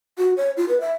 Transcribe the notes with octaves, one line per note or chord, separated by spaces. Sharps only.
F#4
C#5
F4
B4
E5